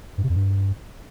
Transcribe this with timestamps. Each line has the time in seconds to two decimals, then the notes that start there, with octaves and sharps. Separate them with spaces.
0.18 G2
0.24 C3
0.30 F2
0.35 G2